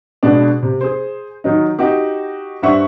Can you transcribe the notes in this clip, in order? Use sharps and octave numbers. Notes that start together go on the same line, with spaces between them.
B2 G#3 B3 D4
C3
G#4 C5
D#3 F#3 D#4
D#4 F#4 G4
G2 C5 E5 F#5 C#6